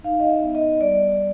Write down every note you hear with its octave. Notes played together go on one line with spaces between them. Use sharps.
D#4 F5
D#5
E5
B3
D#5
G3 D5